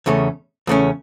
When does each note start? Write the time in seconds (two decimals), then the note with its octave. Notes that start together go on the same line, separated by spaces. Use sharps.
0.06 E2 C#3 A3 C#4
0.67 E2 C#3 A3 C#4